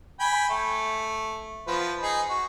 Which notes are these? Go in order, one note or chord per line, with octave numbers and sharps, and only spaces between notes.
G5 G#5 B5
A3
F3 B3
D#4 G#4
F#4